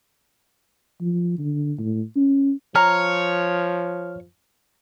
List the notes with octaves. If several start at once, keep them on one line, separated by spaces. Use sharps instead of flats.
F3
D3
A2
C#4
F3 C#5 A#5 F6